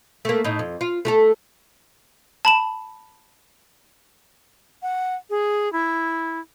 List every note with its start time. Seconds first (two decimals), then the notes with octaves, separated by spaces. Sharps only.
0.25 A3 A#3
0.44 A2 D#4
0.59 F2
0.81 F4
1.05 A3 G4 A4
2.45 A5 B5 E7
4.82 F#5
5.30 G#4
5.73 E4